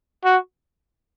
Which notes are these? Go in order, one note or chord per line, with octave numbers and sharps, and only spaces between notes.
F#4